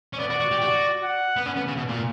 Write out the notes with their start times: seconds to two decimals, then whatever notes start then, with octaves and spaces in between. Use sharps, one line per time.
0.13 C#4
0.19 B3 D5
0.30 F#4
0.40 F#4
0.51 G4
0.61 F#4
1.03 F#5
1.36 B3
1.46 C#4
1.56 B3
1.67 C#3
1.76 B2
1.88 A#2